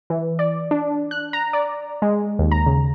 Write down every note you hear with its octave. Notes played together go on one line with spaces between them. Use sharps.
E3
D5
D4
F#6
A#5
D5
G#3
D#2
A#5
C#3